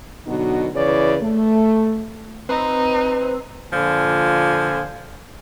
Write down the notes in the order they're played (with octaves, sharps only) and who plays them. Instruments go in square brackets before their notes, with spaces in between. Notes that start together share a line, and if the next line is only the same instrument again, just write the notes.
[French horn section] B2 D3 F#3 B3 D#4 F#4
C#3 E3 E4 B4 C#5 D5
A3
[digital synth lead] C4 [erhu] D#4 [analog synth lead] B4
[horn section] A#2 D3 F3 G#5